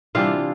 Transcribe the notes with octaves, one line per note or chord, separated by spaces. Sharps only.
C3 E3 G3 D4 F4 F5